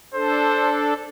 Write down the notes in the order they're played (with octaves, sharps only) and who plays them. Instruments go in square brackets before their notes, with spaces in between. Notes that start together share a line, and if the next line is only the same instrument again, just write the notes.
[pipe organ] D4 A4 [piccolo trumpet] C5